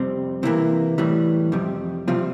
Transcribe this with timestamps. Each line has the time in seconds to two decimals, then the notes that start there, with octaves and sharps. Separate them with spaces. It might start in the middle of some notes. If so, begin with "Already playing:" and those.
Already playing: F2 C3 G3 C4
0.43 C3 E3 A#3 E4
0.98 A2 E3 G3
1.52 F2 C3 G3
2.08 C3 F3 G3 C4 F4